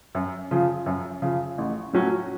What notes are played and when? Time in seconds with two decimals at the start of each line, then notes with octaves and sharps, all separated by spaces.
0.15 F#2
0.51 C#3 F3
0.86 F#2
1.22 C#3 F3
1.58 A1
1.93 A2 F#3 C#4 F#4